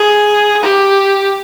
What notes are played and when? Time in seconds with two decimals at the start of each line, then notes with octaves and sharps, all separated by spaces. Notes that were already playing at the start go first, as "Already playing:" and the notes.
Already playing: G#4
0.63 G4